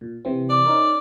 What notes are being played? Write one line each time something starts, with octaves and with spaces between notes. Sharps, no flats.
A#2
C3 E3 C4
D5
C#4 D#4 A#4